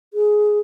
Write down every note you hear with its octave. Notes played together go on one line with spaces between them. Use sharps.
G#4